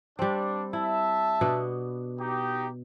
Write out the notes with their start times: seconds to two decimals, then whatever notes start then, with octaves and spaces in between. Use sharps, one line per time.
0.19 G3 C4 D4
0.73 E4 E5 A5
1.41 B2 B3 D4
2.19 D#4 G4